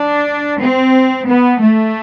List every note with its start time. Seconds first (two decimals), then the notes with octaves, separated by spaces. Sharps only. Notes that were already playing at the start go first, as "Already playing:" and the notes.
Already playing: D4
0.59 C4
1.27 B3
1.61 A3